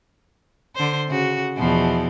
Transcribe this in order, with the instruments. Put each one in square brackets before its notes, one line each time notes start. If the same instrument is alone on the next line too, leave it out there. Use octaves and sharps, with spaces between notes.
[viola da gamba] D3 C5
C#3 F#4
E2 B2 F3